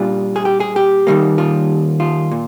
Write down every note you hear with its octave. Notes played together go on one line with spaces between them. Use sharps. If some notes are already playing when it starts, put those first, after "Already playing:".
Already playing: A#2 G3 D4 F4
G#4
G4
G#4
G4
D#2 D#3 G3 A#3
F4
F4
A#2